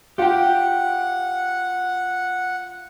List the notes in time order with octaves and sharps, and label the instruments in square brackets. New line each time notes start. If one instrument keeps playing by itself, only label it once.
[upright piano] F4 [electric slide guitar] G4 G5 [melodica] F#5